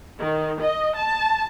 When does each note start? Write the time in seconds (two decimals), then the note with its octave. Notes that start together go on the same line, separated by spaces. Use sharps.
0.19 D#3
0.60 D#5
0.95 A5